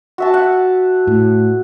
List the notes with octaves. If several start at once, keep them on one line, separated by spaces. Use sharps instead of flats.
F#4 E5 A5
F#5
A2